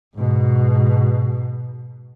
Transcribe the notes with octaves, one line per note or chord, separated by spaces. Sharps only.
G#2 B2